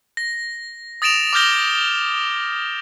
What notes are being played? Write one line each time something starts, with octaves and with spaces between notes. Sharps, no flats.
A#6
D#6 A6 A#6 D7 E7 F7
D6 D#6 F6 G6 A#6 G7